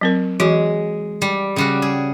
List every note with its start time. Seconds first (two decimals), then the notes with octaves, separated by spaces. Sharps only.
0.01 F#3 C4 A#4
0.40 E3 G#3 F#4
1.22 G3
1.56 C#3 G3 F#4
1.82 G#4